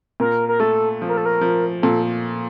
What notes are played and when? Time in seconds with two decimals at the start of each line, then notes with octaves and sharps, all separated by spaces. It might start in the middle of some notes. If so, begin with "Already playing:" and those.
0.20 A#2 A#4
0.49 A#4
0.60 A3 A4
1.02 F3
1.09 A#4
1.17 A4
1.26 A#4
1.41 F3
1.82 A#2 A4